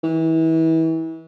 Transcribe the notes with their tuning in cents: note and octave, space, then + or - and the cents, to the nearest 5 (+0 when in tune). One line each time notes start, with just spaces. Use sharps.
E3 -30